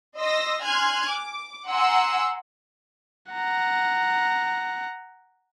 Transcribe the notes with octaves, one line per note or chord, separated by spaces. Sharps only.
D#5 C6 E6 A#6
G#5 C6 F6 F#6 G#6
D6
F#5 G#5 A#5 C6 E6
F#5 A#5